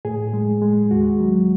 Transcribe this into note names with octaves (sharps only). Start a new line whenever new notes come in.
A2 G#4
G#3
G#3
D#2 F#4
F#3